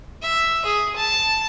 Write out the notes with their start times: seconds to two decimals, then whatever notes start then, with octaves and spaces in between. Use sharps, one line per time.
0.22 E5
0.65 G#4
0.96 A5